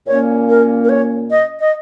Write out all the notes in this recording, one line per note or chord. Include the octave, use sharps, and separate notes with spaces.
A#2 A#3 C#4 C#5
A#4
A#4
C#5
D#5
D#5